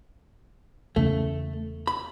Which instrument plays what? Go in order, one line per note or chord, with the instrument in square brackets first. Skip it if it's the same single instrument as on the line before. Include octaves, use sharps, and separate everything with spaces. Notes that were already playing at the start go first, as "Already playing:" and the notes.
[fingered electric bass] E2 C#3 [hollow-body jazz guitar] A3
[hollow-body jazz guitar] B5